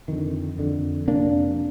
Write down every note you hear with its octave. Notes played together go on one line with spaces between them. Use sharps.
F2 D3 D#3
F2 D3
F2 C3 A#3 D4